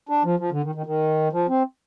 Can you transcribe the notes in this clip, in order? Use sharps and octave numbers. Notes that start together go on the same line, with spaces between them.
D4
F3
F3
D3
D#3
D#3
D#3
F3
C4